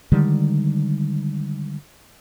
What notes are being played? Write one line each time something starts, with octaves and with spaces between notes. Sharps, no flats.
D3 D#3 G3 G#3